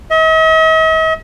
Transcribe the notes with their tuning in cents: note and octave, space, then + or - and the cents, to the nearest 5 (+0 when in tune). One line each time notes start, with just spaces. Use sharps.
D#5 +45